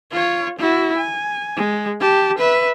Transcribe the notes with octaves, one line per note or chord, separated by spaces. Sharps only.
F4 C#5
E4 F#4
G#5
G#3
G4 A5
B4 E5